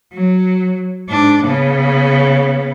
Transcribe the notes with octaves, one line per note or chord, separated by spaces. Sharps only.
F#3
G#2 D4
C#3 B3